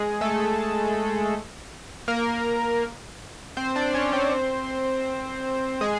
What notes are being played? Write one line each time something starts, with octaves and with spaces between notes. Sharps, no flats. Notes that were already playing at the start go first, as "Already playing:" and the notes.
Already playing: G#3 G#4
A3 A4
A#3 A#4
C4 C5
D4 D5
C#4 C#5
C4 C5
G#3 G#4